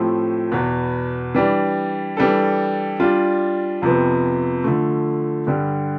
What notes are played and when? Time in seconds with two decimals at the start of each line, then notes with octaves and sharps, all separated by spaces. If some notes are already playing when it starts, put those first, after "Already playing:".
Already playing: A2 F3 A3 C4 G4
0.51 E2 B2 B3
1.35 E3 G3 D4
2.17 E3 G3 D4 A4
3.00 G3 D4 F4
3.82 F2 C3 F3 B3
4.64 D3 F3 A3
5.47 G2 D3 G3